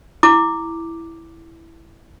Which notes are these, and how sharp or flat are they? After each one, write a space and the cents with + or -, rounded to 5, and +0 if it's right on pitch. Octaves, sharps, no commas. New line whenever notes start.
E4 +0 D6 +0